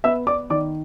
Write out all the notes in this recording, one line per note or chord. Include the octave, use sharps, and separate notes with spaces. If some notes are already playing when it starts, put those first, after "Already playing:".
B3 E5 E6
B3 D5 D6
D#3 D5 D6